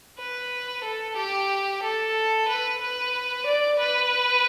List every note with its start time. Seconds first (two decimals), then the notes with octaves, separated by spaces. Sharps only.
0.19 B4
0.84 A4
1.17 G4
1.83 A4
2.48 B4
2.81 B4
3.46 D5
3.79 B4